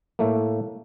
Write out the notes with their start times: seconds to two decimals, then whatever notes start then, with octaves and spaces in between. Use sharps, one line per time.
0.19 A2 A3 A#3